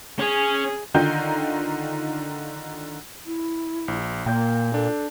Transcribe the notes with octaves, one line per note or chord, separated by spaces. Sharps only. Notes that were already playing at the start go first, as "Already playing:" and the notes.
C#4 G#4
D3 D#3 D#4 F4 G5 G6
E4
A#1
A#2 A#3 G5 G6
D4 A4